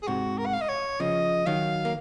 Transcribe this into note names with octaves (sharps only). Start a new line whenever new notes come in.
G#4
G#2 C3 F#4
A#4
F#5
F5
D#5
C#5
C#3 F3 D#5
D#3 F#3 F5
A#3